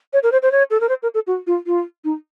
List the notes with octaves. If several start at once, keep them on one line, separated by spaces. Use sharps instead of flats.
C#5
A#4
C5
C5
C#5
A4
A#4
C5
A#4
A4
F#4
F4
F4
D#4